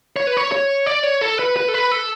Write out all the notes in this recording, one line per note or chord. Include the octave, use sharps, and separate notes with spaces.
C#5
B4
C#5
C#5
D5
C#5
A4
B4
B4
A4
B4
A4